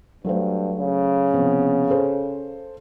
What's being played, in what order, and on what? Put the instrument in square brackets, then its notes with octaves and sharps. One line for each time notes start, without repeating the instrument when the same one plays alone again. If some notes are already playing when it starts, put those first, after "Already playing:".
[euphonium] G2 [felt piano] F#3 A3 C5
[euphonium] C#3
[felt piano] C3 F3 B3
G#4 A4 C5